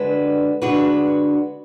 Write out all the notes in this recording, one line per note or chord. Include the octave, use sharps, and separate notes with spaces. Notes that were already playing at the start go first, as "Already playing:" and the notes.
Already playing: D3 G#3 D4 F#4 B4
D3 G#3 D4 F#4 B4